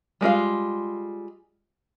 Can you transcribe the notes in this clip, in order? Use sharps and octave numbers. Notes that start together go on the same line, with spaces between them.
G3 G#3 F4 F5